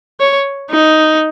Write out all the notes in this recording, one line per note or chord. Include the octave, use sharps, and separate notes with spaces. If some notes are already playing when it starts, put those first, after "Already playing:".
C#5
D#4